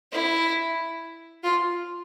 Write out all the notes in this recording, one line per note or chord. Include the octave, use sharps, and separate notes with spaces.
E4
F4